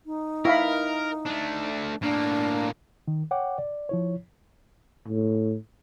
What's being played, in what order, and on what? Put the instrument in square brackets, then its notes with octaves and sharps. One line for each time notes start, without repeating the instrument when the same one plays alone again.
[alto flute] D#4
[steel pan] E4 F5 B5 [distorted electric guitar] A#4
[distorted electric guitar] A3 D4
[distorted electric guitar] A2 A#3 [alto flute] D4
[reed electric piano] D#3
C#5 F#5 G5 D6
D5
F3 E4 C#5
[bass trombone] A2